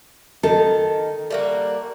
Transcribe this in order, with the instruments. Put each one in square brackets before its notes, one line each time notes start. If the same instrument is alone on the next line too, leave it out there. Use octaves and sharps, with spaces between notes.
[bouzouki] D#3 [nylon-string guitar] A4
[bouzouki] G3 A#3 F#4